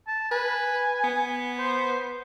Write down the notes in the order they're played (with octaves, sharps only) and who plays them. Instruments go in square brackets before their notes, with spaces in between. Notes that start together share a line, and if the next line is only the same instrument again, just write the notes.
[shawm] A5
[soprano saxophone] B4 [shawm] G#5
[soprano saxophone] B3
[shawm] C5